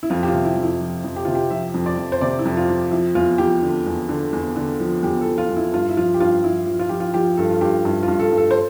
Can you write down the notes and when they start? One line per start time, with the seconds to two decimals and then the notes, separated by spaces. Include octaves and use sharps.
0.03 E4
0.10 F2 F4
0.23 G4
0.28 F4
0.34 C3
0.45 E4
0.56 F2
0.63 E4
0.80 F3
1.04 F2
1.16 G4
1.25 C3 F4
1.35 G4
1.50 F3 E5
1.74 F2
1.86 D5
1.97 F2
2.12 C5
2.21 C3 D5
2.39 E4
2.45 F2
2.57 F4
2.69 F3
2.91 F3 E4
3.15 E2 F4
3.38 F3 G4
3.62 D3
3.86 E2
4.09 D3
4.33 E2
4.56 D3
4.80 F3
5.03 E2 G4
5.21 A4
5.26 F3
5.38 F4
5.50 E2
5.57 E4
5.73 G2 F4
5.89 E4
5.97 F3 F4
6.14 G4
6.20 G2 F4
6.44 F3 E4
6.67 F3
6.79 F4
6.89 F3 G4
7.00 F4
7.14 F3 G4
7.37 G2 A4
7.50 F4
7.61 G2 G4
7.85 G2 E4
8.03 F4
8.08 G2
8.19 A4
8.32 G2
8.37 A4
8.51 C5